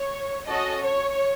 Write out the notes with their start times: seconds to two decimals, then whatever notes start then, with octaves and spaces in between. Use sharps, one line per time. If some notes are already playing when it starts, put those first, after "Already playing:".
Already playing: C#5
0.48 C#4 F#4 A4 D#5
0.82 C#5